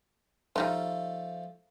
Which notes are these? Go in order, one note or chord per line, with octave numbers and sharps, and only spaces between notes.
F3 G3 A3 D#4 F4